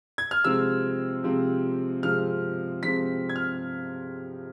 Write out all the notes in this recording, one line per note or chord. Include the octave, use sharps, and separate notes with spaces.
G#6
F6
C3 F3 G#3 C4 E6
C3 F3 G#3 C4
C3 F3 G#3 C4 F6
C3 F3 G#3 C4 B6
G#6
F6